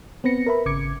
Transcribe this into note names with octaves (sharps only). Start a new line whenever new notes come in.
B3 C4 B4 A#6 C#7
A#4 B4 E5 B5
G#1 C#3 D6 G#6 C#7